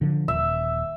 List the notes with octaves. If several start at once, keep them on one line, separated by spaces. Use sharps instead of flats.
D3 D#3 F3
D#1 E5